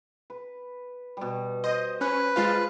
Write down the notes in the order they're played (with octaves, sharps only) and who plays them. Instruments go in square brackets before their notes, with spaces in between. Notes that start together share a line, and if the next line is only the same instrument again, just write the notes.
[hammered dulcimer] B4
B2 G3
[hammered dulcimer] C5 [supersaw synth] D#5
[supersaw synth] C#4 [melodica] B4
[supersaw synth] G#3 F4 F5 [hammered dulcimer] A5